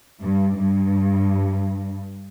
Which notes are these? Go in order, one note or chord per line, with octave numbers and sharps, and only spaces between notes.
G2
G2